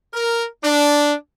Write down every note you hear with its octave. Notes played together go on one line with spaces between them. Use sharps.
A#4
D4